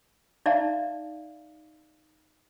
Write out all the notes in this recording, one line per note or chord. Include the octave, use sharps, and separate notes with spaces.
D#4 D5 E5 F5 A5 A#5